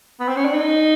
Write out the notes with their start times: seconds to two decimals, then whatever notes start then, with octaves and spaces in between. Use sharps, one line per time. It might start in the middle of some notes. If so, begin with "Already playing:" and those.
0.20 B3
0.28 C4
0.37 C#4
0.45 D4
0.54 D#4